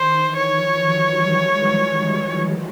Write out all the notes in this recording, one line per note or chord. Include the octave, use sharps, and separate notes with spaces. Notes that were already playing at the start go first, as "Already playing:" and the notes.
Already playing: D#3 C5
E3
C#5
D#3 F3
E3 F#3
F3 G3
F#3 G#3